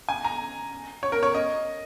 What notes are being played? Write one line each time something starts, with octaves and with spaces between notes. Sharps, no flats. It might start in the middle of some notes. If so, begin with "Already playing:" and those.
G#5
A#5
C#5
A#4
C#5
D#5